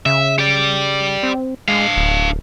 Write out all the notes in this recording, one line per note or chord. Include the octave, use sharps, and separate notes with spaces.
C#3 E5
G4 D5
C4
G#3 D4 F5
D1